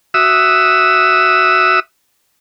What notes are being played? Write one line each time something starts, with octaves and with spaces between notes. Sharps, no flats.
F#4 E5 D#6 E6